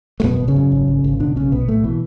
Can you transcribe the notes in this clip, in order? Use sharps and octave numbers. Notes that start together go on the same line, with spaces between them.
A3
F#2 B2 B3
G#1
C#3 C#4
F#2
G#1
G#1
G#1
B2 D3 D4
B1 C#3 C#4
B1 B2 B3
B1 A2 A3
B2 E3